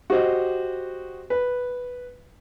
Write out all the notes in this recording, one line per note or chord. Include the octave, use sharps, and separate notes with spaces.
F#4 G4 C5 D#5
B4